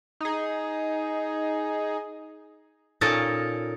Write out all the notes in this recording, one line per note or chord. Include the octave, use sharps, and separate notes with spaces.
D#4 G#4
A#2 C#4 D#4 A4 A#4 A5